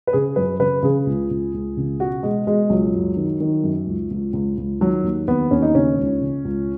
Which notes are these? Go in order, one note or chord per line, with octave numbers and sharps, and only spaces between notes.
B4
C#3 G#4
F#2 B4
C#3 B4
C#3 G#4
C#2
C#2
C#2
C#3
B2 F#4
B2 G#3
B2 G#3
C#2 F#3
F#2
D#3
D#3
F#2
C#2
C#2
C#2
C#2
D#3 F#3
D#2
D#2 B3
D#2 C#4
D#4
C#3 C#4
C#2
C#3
C#2